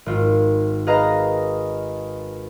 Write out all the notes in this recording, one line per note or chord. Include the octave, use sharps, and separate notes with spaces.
G#1 F4
G#4 B4 D#5 F5 A#5